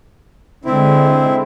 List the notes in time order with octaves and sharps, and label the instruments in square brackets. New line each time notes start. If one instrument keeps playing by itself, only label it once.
[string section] D3 G#3 [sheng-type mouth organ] C4 E4